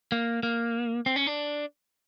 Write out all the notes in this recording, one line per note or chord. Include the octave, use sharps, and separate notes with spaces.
A#3
A#3
C4
C#4
D4